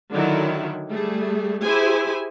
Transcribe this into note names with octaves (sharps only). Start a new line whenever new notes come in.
D3 D#3 F#3 E4
G3 A3 G#4
E4 G4 G#4 C5 G#5